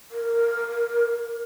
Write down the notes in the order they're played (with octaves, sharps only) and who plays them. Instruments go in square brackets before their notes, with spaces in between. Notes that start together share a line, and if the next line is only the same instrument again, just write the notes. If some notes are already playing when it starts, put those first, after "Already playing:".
[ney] A#4